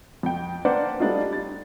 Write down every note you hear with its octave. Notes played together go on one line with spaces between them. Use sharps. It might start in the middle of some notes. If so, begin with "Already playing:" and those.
F2 G5
A#3 D4 B4 C5 D5 F#5
G3 A3 D4 D#4 F4
A6